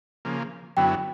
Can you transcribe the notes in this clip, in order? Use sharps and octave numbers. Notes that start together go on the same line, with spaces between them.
C#3 F3 A#3
F#2 D3 F#3 B3 E4 G5